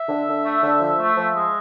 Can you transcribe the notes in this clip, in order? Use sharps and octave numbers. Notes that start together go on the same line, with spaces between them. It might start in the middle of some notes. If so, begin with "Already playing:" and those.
Already playing: E5
D3
D3
A3
D3
F3
A3
F3
G#3